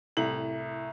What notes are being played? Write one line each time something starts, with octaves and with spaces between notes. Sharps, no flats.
C2 A2 F#7